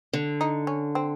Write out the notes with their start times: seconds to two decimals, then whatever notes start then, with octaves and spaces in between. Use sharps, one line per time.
0.13 D3
0.41 D#4
0.67 C#4
0.95 C4